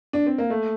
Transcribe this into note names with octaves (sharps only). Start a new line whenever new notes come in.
D4
C4
A#3
A3